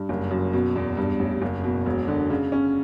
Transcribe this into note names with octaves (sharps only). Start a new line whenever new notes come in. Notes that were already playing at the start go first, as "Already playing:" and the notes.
Already playing: G2
F#1
F#2
B2
E2
G2
A1
F#1
B2
E1
D3
C#3
C#4